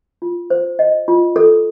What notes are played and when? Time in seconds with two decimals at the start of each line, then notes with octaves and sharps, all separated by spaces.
0.22 F4
0.50 C5
0.79 D#5
1.08 F4
1.36 A4